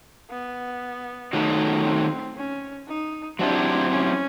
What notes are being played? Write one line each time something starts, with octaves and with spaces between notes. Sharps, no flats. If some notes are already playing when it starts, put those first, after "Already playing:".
B3
D#3 F#3 A3
C4
C#4
D#4
F#3 A3 C4 D4 E4 G4
C#4